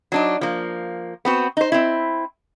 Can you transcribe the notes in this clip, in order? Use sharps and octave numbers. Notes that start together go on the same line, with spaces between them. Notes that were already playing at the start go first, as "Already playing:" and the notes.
F#3 D4 D#4
F3 A#3
B3 C4 F#4
D#4 C5
C4 E4